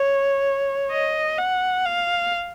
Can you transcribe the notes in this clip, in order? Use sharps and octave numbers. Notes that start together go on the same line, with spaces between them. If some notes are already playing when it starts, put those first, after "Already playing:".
Already playing: C#5
D#5
F#5
F5